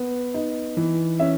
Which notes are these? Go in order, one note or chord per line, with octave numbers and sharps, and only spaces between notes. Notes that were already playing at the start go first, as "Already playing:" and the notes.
Already playing: B3
D#4
E3
C#4 E5